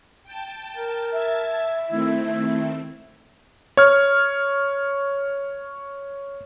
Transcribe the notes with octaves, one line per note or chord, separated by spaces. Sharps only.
G5 A5
A#4
E5 A5 G#6
D#3 A3 C4 E4
C#5 F6